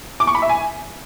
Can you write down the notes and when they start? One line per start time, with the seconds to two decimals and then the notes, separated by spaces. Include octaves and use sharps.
0.20 D6
0.27 C#6
0.35 B5
0.42 E5
0.49 G#5